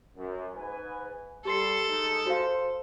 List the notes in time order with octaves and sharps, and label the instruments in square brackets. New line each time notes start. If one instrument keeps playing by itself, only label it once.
[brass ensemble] F#2
G#2 B4 G#5
[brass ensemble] G3 [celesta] G4 C6 C7 [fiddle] A4
[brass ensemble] G#3 D#4
[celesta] F#4 F5 [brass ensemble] C5